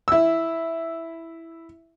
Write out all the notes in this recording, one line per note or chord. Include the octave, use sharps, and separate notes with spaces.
E4 E6